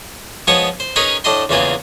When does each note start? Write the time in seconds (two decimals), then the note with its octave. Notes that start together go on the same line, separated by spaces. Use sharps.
0.47 F3 G#3 B3 C#5 C#6 D#6
0.80 C5
0.96 C#4 D#4 G#4 A#4 B4 C#5
1.24 A2 D4 D#5 C6
1.49 E2 C#3 E3 A#3 F4 G#4